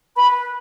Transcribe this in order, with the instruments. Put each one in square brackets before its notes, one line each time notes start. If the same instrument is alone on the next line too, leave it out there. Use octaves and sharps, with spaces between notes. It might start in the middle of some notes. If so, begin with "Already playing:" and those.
[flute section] B4 B5